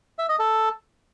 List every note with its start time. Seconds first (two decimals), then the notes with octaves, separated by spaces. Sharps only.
0.19 E5
0.29 D#5
0.39 A4